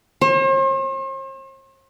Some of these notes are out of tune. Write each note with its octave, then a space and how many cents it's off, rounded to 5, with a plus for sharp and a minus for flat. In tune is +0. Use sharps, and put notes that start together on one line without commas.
C5 +45